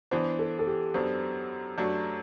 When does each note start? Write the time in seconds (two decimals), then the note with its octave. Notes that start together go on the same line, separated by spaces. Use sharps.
0.11 E3 B3 D4 C5
0.39 A4
0.59 A4
0.67 G4
0.94 F#2 F#3 B3 D4 C5
1.78 F#2 F#3 A3 D4